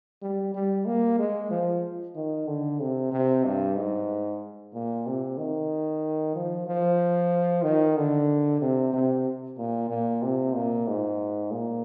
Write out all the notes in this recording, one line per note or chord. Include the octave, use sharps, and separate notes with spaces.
G3
G3
A#3
G#3
F3
D#3
D3
C3
C3
G2
G#2
A#2
C3
D#3
F3
F3
D#3
D3
C3
C3
A#2
A#2
C3
A#2
G#2
A#2